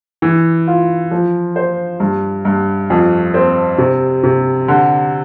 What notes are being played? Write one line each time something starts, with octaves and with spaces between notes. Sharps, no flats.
E3
F4
F3
C5
G2
G2
F2
C4
C3
C3
D3